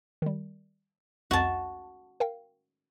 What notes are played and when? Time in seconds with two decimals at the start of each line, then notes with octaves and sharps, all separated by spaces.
0.22 D#3 G3
1.31 C2 F2 F#4 A5
2.20 A#4 F5 G5